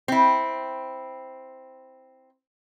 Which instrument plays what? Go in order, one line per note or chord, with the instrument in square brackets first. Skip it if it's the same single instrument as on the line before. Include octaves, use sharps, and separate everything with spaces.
[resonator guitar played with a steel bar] C4 E4